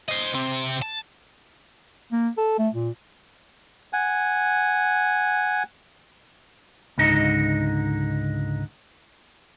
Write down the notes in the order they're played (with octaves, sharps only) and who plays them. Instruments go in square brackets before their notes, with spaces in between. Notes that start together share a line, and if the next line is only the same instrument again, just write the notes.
[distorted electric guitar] C5 D#5
C3 C4
A5
[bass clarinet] A#3
A4
A3
A#2
[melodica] F#5 G#5
[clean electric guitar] C#2 G#2 D3 D#4 D#5